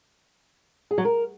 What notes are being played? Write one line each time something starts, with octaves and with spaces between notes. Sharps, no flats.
G#4
F#3
A#4